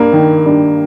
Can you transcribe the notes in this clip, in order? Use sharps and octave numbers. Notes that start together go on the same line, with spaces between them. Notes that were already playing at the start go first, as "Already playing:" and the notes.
Already playing: G2 A#3
D#3
G2